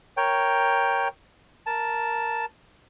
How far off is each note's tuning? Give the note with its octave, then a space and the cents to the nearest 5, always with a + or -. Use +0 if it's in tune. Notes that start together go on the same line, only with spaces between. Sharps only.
A#4 +0 C#5 +0 G5 +0
A#4 +0 A5 +0